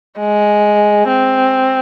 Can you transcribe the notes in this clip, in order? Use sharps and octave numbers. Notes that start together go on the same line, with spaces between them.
G#3
C4